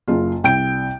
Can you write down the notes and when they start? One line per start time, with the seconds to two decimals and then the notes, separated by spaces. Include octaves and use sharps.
0.08 F#1 F4
0.44 C2 G5 G6 D7